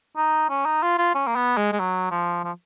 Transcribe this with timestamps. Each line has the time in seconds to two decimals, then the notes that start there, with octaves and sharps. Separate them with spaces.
0.17 D#4
0.50 C#4
0.66 D#4
0.83 F4
0.98 F4
1.15 C#4
1.27 A#3
1.36 B3
1.57 G#3
1.72 G#3
1.80 F#3
2.11 F3
2.44 F3